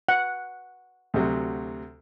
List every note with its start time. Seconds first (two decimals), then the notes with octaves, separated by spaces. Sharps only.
0.09 F#5
1.14 D2 C3 F#3